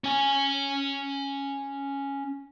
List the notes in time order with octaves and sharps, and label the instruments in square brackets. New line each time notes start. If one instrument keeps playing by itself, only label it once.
[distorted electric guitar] C#4 G#5